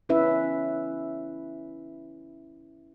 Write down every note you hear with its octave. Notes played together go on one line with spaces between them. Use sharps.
C#4 E4 B4 E5